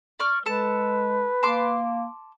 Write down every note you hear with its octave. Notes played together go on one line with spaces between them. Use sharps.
D5 C#6 F6
G#3 A4 B4 A5
A#3 A5 C6 D6